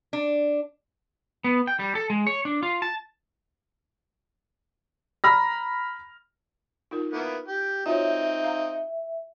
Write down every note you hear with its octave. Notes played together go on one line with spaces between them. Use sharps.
D4
B3
G5
G3
A4
G#3
C#5
D4
F4
A5
A#5 B5 F6 A#6
D#4 F4 A#4
A#3 B3 E4
G4
C4 D#4 F4 F#4 C#5 E5
F5 A#5